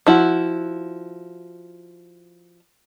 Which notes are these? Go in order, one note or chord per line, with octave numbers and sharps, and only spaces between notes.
F3 E4 F#4